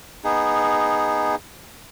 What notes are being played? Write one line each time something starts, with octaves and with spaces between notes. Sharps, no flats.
B3 D#4 G#4